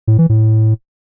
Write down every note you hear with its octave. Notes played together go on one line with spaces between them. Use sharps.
A2
E3
A2